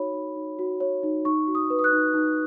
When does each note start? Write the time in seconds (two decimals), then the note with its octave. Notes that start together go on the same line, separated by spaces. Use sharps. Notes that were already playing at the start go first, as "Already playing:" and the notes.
Already playing: D#4 F#4 C#5 B5
0.14 D#4
0.36 D#4
0.59 F#4
0.80 C#5
1.03 D#4
1.25 D#4 C#6
1.47 F#4
1.55 D#6
1.70 B4
1.79 D#6
1.84 F#6
1.92 D#4
2.14 D#4